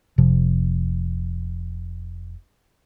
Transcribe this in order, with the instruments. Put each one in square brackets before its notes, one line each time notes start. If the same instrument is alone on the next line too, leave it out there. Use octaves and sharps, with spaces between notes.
[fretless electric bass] F1 C3 F3